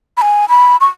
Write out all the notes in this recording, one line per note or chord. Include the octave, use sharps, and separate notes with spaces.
B5
G#5
B5
C#6